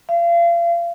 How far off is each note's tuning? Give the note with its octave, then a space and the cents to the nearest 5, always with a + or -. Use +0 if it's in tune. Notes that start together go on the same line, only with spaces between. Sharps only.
F5 -35